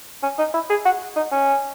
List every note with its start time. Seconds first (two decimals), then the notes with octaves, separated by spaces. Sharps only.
0.23 C#4
0.38 D#4
0.54 E4
0.70 G#4
0.85 F#4
1.16 D#4
1.32 C#4